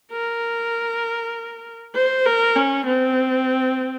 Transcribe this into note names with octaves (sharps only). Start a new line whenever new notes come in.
A#4
C5
A#4
C#4
C4